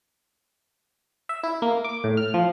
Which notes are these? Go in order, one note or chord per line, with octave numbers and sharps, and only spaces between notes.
E5
E4
A#3
D6
A2
F6
F3